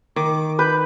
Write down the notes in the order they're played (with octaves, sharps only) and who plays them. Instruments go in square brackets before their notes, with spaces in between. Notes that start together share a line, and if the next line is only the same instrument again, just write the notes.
[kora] D#3 [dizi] D6
[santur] B4 [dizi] G6